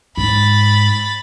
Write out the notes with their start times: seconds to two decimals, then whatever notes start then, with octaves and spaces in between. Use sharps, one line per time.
0.17 G#2 B5 A6